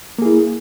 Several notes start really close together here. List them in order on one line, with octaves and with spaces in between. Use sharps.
A#3 G#4 E4